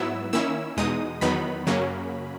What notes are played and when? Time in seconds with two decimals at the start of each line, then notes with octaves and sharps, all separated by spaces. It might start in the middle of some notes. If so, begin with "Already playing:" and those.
Already playing: G#2 F#3 B3 E4 E6
0.33 D#3 A#3 C#4 E4 E6
0.77 E2 B2 G#3 D#4 D#6
1.21 E2 D#3 F#3 B3 D#4 B5
1.67 F#2 C#3 F#3 A#3 C#4